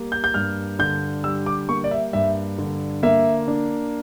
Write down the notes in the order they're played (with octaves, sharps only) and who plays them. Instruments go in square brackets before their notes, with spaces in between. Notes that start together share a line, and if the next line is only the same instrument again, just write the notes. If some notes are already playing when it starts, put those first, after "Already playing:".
Already playing: [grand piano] G3 A#3
G6
G6
G2 F6
D3 G6
G3 E6
D6
A#3 C#6
D5
E5
G2 E5
D3
A#3 E5
D4